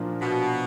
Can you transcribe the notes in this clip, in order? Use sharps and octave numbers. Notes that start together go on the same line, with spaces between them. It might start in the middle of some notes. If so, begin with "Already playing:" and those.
Already playing: A#2 F3 A#3 D4 F4
B2